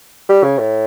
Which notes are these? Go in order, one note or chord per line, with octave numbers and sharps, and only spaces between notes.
G3
C#3
A2